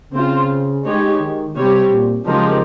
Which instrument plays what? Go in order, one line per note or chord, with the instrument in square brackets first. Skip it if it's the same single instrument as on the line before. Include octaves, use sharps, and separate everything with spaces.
[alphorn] C#3 [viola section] C4 F4 C5
[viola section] G#3 D#4 G4 C#5
[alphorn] D#3
[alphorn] C3 [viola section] G3 C4 G4 C#5
[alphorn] A#2
[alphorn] C#3 [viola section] F3 G#3 D#4 G4 A#4